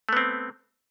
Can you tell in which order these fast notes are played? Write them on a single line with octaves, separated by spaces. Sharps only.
A3 B3 C4